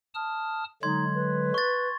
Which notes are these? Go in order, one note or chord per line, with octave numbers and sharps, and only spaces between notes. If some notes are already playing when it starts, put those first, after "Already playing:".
A5 D#6 F6
D3 F#3 G#3 D#4 C6 G#6
B4
C#6 A6